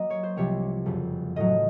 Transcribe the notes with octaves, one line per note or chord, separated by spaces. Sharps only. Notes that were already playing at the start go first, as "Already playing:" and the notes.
Already playing: F#3 A#3 D#5
C#5
C5
C2 C3 F3 C4 C#5
F#1 F2 C#3
A1 A2 F#3 D#5